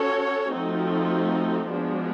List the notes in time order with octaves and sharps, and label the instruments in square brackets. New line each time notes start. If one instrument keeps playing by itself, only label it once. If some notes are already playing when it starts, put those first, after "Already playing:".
Already playing: [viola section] C#4 F#4 A4 C#5
F3 A3 C4 D#4 F#4
F3 G#3 B3 D4 F#4